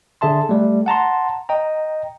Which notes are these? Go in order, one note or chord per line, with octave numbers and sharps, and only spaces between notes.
D3 G#4 E5 A5 C6
G3 A3
F#5 A5 A#5 C6
D#5 G5 A#5